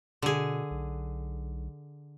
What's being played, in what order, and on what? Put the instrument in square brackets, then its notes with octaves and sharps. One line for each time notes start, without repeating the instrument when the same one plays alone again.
[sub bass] B2 [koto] D3 G#4
[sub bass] B1